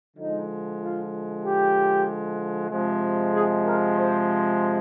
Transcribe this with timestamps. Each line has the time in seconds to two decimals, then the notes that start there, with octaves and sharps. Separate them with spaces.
0.16 D3 F3 G#3 D#4
0.80 F4
1.44 G4
2.70 C3 F3 G#3
3.33 G#4
3.65 A#4
3.97 C5